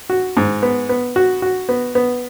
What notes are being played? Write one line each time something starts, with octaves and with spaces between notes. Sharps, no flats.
F#4
G#2
B3
B3
F#4
F#4
B3
B3